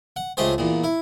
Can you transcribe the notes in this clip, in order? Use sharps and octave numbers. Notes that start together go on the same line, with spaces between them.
F#5
C#2 A3 G4 G#4 C5
E2 A#2
E4